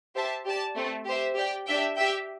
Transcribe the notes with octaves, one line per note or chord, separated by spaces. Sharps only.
G4 C5 E5 A5
G4 D5 A5
A3 C4 A4
G4 C5 E5
G4 D5 G5
D4 G4 E5 G5
G4 E5 G5